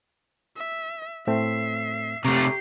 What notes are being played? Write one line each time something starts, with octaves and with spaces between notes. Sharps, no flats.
E5
A2 A3 C4 E5 C7
C3 A3 G4 A#5 C#6 C7